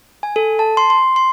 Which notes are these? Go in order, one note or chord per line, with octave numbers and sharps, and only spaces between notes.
G#5
A4
A5
C6
C6
C6